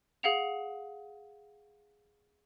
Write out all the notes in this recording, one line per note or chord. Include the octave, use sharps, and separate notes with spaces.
G#4 F5 F#5 F7